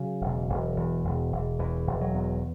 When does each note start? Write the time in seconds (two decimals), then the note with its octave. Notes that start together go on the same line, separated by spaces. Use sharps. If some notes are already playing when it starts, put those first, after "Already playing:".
Already playing: C#3 F#3
0.21 E1
0.49 E1
0.77 E2
1.04 E1
1.32 E1
1.59 E2 E3
1.86 E1
2.01 F#3
2.14 E2